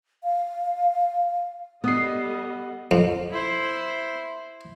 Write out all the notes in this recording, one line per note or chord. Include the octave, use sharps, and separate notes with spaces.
F5
G3 B3 A4 D#5 D#6 C7
F2
E4 C5